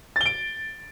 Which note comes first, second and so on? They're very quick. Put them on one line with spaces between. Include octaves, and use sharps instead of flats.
A6 G7 D7